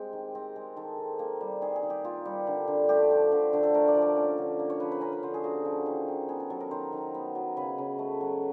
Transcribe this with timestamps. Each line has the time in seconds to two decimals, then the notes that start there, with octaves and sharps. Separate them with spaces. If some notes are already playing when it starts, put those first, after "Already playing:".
Already playing: G#3 C4 G4
0.13 D#3
0.35 C4
0.56 G#3
0.77 D#3 A4
0.98 D#3
1.19 A#3
1.41 G3
1.62 D#3 G#4
1.76 G#4
1.83 D#3
1.90 G4
2.04 A#3 F4
2.25 G3
2.47 D3
2.68 D3
2.89 A3 G4
3.11 F3
3.32 D3
3.53 D3
3.63 A4
3.74 A3 A#4
3.88 D5
3.96 F3
4.02 D5
4.16 C#4
4.38 D3
4.59 A#3
4.70 C#5
4.80 F3 B4
4.92 B4
5.01 C#4 A#4
5.12 B4
5.23 D3 C5
5.34 G#4
5.44 A#3 F#4
5.65 F3
5.86 D#3
6.08 D#3
6.29 B3 G#4
6.40 A4
6.50 F#3 A4
6.60 A#4
6.71 D#3 C5
6.92 D#3
7.15 B3
7.35 F#3
7.57 C#3 B4
7.78 C#3
7.99 A3
8.21 F#3